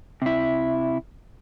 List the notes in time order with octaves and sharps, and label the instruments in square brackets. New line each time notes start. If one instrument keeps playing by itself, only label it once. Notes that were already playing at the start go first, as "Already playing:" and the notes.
[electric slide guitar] C3 E4